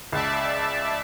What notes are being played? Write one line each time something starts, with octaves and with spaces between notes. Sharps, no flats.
C#2 D5 E5 A5